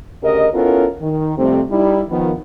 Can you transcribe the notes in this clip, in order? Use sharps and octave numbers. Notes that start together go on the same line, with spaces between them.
D2 C#3 G4 A#4 D#5
B3 C#4 E4 F4 A4 A#4
D#3
F2 C3 G3 A3 C4
G3 D#4 E4
D#3 F3 B3